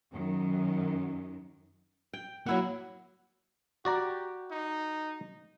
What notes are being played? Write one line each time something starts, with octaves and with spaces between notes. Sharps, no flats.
F#2 D#3
G5
F#3 A#3 E4 F#5
F#4 G4 D5 A#5
D#4